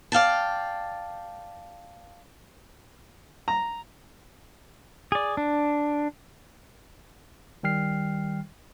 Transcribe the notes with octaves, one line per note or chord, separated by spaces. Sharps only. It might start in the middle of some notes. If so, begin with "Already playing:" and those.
D5 F5 G5 A5
A#5
G#4 D5
D4
D#3 G3 G5 F6 C7